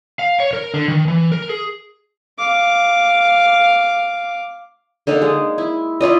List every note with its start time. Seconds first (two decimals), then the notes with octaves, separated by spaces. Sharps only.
0.19 F5
0.40 C#5
0.53 A#4
0.74 D3
0.88 D#3
1.08 E3
1.32 A#4
1.50 G#4
2.39 F5 D6
5.07 D3 A#3 D#4
5.22 G#3
5.58 E4
6.00 E4 F4 D5 D#5